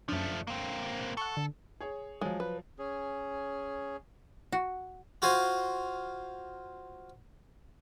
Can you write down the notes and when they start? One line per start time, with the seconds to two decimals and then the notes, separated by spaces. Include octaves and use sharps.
0.08 F#2 F3 A3 D4
0.47 A#3 C4
1.17 A4 F#5 C#6
1.37 D3
1.80 G#4 C#5
2.21 F3 F#3 G#3
2.40 B4
2.78 C#4 G#4
4.52 F#4
5.22 F4 F#4 C5 F5 G#5